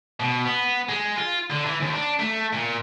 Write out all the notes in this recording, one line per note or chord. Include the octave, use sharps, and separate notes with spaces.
B2
B3
G#3
F4
D3
E3
D#2
D4
A3
A#2